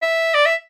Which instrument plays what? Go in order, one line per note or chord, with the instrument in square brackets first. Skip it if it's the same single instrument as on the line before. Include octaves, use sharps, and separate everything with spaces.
[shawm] E5
D5
E5